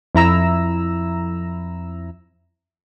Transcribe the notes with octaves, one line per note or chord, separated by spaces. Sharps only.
F2 E4 A#5 E6